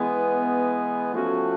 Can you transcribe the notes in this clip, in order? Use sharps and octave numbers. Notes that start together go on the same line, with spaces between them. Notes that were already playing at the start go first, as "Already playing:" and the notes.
Already playing: E3 G#3 B3
F3 A3 C#4 F#4 A4